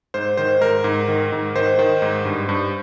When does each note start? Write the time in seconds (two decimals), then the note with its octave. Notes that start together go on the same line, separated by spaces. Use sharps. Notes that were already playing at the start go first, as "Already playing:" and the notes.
0.14 G#2 C5
0.37 D#3 C5
0.61 G#2 A#4
0.84 G#2
1.08 D#3
1.32 G#2
1.55 D#3 C5
1.79 D#3
2.02 G#2
2.25 G2
2.49 G2